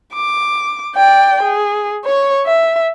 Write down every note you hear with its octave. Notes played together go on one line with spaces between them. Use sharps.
D6
D5 G5
G#4
C#5 C#6
E5